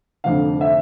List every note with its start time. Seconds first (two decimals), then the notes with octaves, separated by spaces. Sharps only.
0.24 F1 F2 D3 F5
0.61 E5